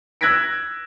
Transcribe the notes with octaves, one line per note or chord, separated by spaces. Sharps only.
E6 F#6 G#6 A#6 B6 D7